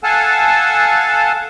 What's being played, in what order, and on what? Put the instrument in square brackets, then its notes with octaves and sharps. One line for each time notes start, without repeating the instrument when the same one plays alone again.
[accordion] A4 F5 F#5 G#5 A5